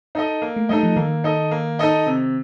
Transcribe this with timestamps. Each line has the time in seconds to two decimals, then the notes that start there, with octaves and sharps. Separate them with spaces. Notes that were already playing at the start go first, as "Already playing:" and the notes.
0.15 D#4 A4 D#5
0.42 A#3
0.56 A3
0.69 G3 D#4 A4 D#5
0.83 F3
0.96 D#3 A#3
1.24 D#4 A4 D#5
1.51 A#3
1.79 D#4 A4 D#5
2.06 C3